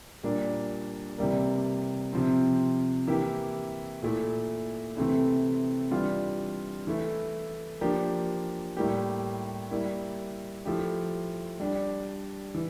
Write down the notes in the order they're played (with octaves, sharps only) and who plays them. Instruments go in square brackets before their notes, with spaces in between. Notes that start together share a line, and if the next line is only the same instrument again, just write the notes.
[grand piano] A#2 G3 A#3 D4
C3 E3 G3 A#3
C3 F3 C4
E3 A#3 E4 G4
A#2 A3 E4
C3 E3 A3 C4 E4
E3 G3 D4 F4
E3 A3 E4
F3 A#3 D4 G4
A2 G3 A#3 E4 G4
G3 A#3 E4
F3 A3 E4 G4
G3 D4 G4
E3